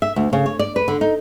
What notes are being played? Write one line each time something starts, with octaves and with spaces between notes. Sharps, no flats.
E5
D2
C#3
C#5
D5
B4
D3
D#4